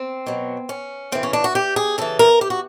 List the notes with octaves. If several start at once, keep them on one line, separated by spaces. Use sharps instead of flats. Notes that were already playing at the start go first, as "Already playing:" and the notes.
Already playing: C4
B2 F#3
C#4
C#3 E3 C4
C#4
D4
F#4
G4
G#4
C#3 E3 A4
A#4
G4
F#4